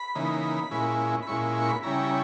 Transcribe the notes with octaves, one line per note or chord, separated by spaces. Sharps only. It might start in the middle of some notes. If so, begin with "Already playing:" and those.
Already playing: B5
C#3 E3 A#3 D#4
A#2 G#3 C#4 E4
B5
A#2 G#3 C#4 E4 C#6
C#6
B5
C#3 G3 C#4 E4 A#5
A#5